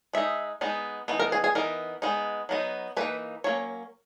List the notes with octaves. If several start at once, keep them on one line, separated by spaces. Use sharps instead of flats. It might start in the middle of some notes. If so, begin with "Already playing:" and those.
G#3 D#4 E5
G#3 B3 D#4
E3 B3 D#4
A#4
G#4
G#4
E3 B3 D#4 A#4
G#3 B3 D#4
F#3 B3 D#4
E3 A#3 D#4 B4
F#3 A#3 C#4 C#5